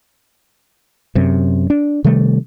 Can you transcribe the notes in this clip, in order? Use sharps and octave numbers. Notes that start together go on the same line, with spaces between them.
F#2 C3
D4
C3 D#3 G3 A3